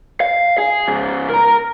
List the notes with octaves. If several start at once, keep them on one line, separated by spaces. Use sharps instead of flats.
F5
G#4
G#2 C#3
A#4 A#5